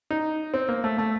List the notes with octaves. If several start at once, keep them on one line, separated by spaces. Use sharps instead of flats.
D#4
C4
A#3
A3
A3